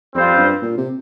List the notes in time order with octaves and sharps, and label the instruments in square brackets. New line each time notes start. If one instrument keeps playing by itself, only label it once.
[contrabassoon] F2 [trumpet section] G3 C4 F4 C5 F5
[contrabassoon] F2
G2
A#2
C3